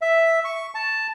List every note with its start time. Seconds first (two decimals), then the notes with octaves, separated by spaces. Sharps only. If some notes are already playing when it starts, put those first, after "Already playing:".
0.01 E5
0.44 C#6
0.75 A5